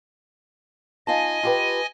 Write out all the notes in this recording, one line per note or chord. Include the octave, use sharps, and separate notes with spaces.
D#4 F4 D#5 G#5 A5
F4 G4 B4